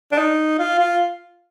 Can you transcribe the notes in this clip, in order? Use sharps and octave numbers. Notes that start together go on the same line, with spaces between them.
D4
D#4
F4
F4